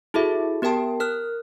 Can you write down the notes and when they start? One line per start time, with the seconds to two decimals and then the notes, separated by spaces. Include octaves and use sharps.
0.14 E4 F#4 G#4 A4 E5
0.62 B3 G4 A#4 G5 A5
1.00 A#4 F6 F#6